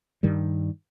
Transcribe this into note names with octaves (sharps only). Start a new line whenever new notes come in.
G2 D#3 G3